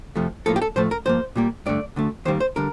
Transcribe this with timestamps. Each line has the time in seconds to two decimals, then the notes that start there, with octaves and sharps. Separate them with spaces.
0.16 F2 C3 F3 A3
0.46 A2 F3 A#3 A4
0.56 G4
0.62 A4
0.76 A2 F3 A3 C5
0.91 A#4
1.05 G2 F3 A#3 C5
1.36 A#2 G3 A#3
1.66 G2 D3 A3 D5
1.96 D2 D3 A3
2.25 D#2 D#3 G3 A#3 C5
2.40 C5
2.56 D3 G3 A#4